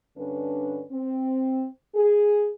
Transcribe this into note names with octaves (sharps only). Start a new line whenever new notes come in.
G2 D3 C#4 D4 B4
C4
G#4